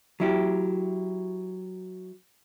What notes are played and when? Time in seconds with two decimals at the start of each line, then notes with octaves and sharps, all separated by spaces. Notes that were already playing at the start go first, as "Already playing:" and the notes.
0.20 F#3 E4 G4